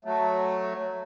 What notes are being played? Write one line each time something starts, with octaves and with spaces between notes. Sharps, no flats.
F#3 A3